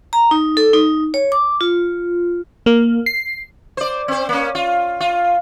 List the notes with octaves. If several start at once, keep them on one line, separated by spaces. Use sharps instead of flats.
A#5
D#4
A4
D#4
C#5
D6
F4
A#3
C7
C5 D5
C4 C5
A#3 C#4
F4
F4